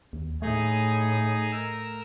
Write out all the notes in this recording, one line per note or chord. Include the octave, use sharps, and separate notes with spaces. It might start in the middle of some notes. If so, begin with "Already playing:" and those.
D#2
A2 A3 D#4 G#4
A#4 E6